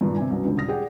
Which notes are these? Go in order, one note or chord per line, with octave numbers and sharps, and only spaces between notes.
G2 A#2 D#3
C3 G#5
C2 F#2 B2
C#2 D3 C#4
D#1 D#6 A#6
G4 G#4 D5 F#5 G5